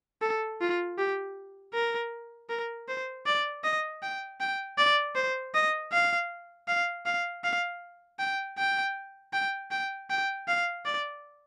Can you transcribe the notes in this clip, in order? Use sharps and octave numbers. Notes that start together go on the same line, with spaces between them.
A4
F4
G4
A#4
A#4
C5
D5
D#5
G5
G5
D5
C5
D#5
F5
F5
F5
F5
G5
G5
G5
G5
G5
F5
D5